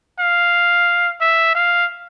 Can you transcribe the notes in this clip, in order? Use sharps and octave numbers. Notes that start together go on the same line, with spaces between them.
F5
E5
F5